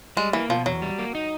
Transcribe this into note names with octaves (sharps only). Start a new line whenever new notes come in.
G3 G#3
E3 A#3
B2 F3
E2 F#3
G3
A#3
D#4